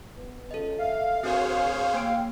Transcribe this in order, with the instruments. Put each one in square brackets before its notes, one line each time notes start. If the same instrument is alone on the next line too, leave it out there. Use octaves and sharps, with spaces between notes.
[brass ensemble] B3 B4
[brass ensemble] C#2 [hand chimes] A4 D#5
[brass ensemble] E5 [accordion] F5
[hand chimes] C4 D4 A#4 [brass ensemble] F#4 [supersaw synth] G#4 C5 C#5
[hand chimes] A#3 D7 [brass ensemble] G5